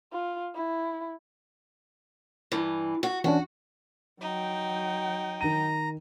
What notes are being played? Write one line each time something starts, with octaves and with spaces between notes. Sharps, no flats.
F4
E4
G2 E3
F#4
E3 C#4 D4 F#4
F#3 D#4 G5
D#3 A#5 D#7